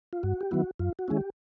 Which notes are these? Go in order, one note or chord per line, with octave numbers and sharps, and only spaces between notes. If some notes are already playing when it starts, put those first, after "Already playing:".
F4
G2 F#4
G4
D#3 F#3 B3 E4 F#4
F#2 F4
F#4
D#3 G#3 C#4 E4 G#4
G4